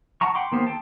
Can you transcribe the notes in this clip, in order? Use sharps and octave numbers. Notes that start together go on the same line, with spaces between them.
F#5 A5 A#5 C#6
F#5 G5 B5 C6 D6
D#3 A#3 B3 G4 C5
A4 G5 A5